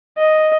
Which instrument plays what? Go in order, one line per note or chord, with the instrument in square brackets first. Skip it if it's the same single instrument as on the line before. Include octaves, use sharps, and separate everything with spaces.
[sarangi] D#5